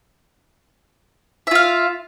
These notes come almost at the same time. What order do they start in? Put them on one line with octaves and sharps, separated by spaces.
E5 F4 F5